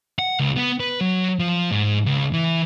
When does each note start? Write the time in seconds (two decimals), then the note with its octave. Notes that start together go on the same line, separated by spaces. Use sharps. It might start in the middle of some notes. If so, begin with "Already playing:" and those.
0.19 F#5
0.40 C#2
0.57 B3
0.80 B4
1.01 F#3
1.39 F3
1.71 G#2
2.06 C#2
2.33 E3